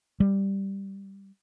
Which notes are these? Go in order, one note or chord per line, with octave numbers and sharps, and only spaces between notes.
G3